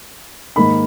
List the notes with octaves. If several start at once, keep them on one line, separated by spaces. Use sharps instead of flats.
G#2 D#3 A#3 D#4 B5